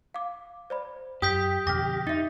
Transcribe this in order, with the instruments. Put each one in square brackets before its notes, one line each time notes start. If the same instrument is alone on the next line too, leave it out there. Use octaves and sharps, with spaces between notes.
[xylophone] F5 D6
C5 D5 B5
[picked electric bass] F#2 [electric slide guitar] G4 [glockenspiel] D#6 G6 B6
[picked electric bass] F2 B2 D3 [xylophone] D6 F6 [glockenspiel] A#6
[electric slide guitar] D#4 [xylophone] E5 A6